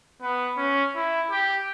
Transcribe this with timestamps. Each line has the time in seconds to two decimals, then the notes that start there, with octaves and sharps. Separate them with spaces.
0.22 B3
0.57 C#4
0.95 E4
1.31 G4